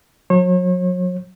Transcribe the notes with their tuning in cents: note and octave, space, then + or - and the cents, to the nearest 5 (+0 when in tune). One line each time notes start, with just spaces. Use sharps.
F#3 -30 C#5 -40